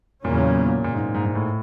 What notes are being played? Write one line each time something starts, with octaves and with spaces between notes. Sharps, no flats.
E2 A#2 C#3 F#3 A#3 C#4
A#2
G#2
G#2
G#2
A2